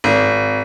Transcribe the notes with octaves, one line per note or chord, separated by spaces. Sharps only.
G#1